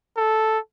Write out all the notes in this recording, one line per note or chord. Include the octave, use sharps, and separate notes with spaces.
A4